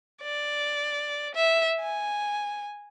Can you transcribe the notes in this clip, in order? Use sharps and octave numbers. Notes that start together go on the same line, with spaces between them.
D5
E5
G#5